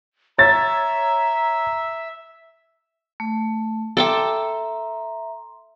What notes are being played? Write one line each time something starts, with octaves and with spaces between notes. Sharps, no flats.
C#5 E5 A#5 A6
A3
A4 E5 G5 A#5 C6 D6